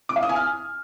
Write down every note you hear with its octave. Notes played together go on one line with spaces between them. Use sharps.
D6
F5
D#6
G#5
F6